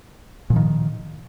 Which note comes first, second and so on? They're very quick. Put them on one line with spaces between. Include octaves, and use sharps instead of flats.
A#2 F3 D#3